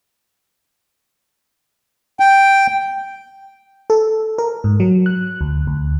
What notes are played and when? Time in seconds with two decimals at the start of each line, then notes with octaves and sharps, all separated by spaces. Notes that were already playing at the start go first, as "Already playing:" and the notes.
2.20 G5
3.90 A4
4.38 A#4
4.64 G#2
4.80 F#3
5.06 F#6
5.41 D2
5.67 D2